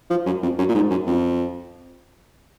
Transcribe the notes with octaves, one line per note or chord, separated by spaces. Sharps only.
F3
F#2
F2
F#2
A#2
G#2
F#2
F2